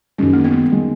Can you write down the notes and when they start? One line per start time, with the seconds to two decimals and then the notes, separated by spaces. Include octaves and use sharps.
0.18 F#2 D#3 G#3 C#4
0.33 A#3
0.44 B3
0.71 D#3 G#3